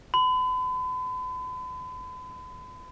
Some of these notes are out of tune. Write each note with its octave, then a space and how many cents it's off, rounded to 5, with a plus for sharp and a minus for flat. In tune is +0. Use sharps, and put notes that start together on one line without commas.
B5 +40